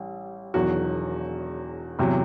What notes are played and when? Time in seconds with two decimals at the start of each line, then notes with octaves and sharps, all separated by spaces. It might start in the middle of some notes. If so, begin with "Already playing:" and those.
Already playing: A1 G3
0.54 E1 E2 D#3 F#3 F#4
1.99 E2 C3 F#3